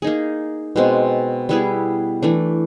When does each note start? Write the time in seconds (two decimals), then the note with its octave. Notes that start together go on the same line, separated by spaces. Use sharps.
0.02 A#3 D#4 G#4
0.76 B2 G#3 C4
1.49 G3 B3 E4 G#4
2.22 E3 A3 D4